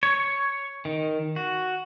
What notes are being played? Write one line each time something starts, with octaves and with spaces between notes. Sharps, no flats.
C#5
D#3
F#4